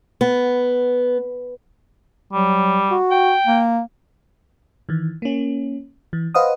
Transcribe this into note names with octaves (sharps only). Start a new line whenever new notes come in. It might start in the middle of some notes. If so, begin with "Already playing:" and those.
B3
F#3 G3
F#4
G5
A#3
D#3 E3
A#3 C#4
E3
B4 C5 D#5 F5 F#5 D#6